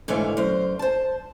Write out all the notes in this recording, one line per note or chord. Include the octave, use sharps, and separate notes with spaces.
G#2 D3 E3 A3 C#5 F5
F#2 C5
C5 A5